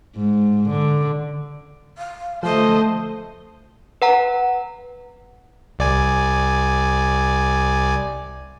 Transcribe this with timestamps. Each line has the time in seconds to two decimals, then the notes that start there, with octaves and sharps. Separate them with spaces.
0.17 G#2
0.69 D3
1.98 F5
2.43 D3 F3 A3 C5 D#5 A5
4.02 B4 F#5 A#5
5.79 C2 D5 G#5